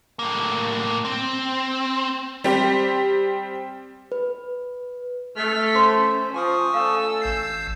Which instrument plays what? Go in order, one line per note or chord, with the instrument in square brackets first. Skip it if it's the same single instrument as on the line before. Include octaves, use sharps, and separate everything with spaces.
[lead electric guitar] A2 A#3
C4
[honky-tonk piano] G3 C4 G4
[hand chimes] B4
[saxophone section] A3 [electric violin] F6 B6
[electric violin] C#4 [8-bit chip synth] C5 [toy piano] C6
[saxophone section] F3 [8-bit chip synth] G#5 C#6 D#6
[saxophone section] A3 D4 A4 [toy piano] F5 [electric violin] E6
[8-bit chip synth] A1 G6 C7